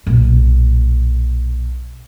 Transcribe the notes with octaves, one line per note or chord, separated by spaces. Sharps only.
B1 A#2